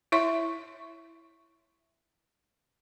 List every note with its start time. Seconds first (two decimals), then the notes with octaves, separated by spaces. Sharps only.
0.12 E4 C#5 E5 C6 C#6